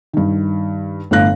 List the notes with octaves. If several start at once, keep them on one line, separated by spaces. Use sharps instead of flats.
G2 D#3
G1 A2 D4 F5 F#6 A#6